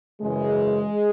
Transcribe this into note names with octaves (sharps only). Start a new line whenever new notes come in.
F#2 C#3 E3 G#3